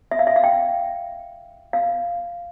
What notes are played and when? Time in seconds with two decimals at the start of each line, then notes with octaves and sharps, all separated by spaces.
0.11 E5
0.19 F5
0.27 E5
0.36 F5
0.44 G5
1.73 F5